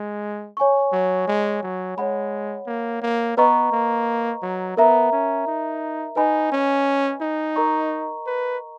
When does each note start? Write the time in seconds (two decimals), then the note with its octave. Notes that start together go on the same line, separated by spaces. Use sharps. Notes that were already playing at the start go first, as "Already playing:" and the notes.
Already playing: G#3
0.57 C#5 G#5 C#6
0.92 F#3
1.27 G#3
1.62 F#3
1.97 G#3 C#5 F#5 B5
2.67 A#3
3.02 A#3
3.37 B3 B4 D#5 A#5 C#6
3.71 A#3
4.42 F#3
4.77 B3 A#4 E5 A#5
5.12 C#4
5.46 D#4
6.16 D#4 B4 D#5 G#5 B5
6.52 C#4
7.21 D#4
7.56 A#4 D#5 A#5 C#6
8.26 B4